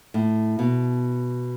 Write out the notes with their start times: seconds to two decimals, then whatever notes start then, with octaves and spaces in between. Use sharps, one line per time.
0.14 A2
0.59 B2